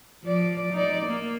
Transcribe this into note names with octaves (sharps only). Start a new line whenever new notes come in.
F3 D5
D#4 D5
A#3